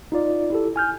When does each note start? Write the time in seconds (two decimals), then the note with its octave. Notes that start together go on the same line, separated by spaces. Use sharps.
0.12 D#4 F4 D5
0.50 E4 G4 A4
0.76 G#5 F6 G6